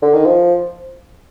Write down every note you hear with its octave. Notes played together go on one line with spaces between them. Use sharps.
D3
D#3
F3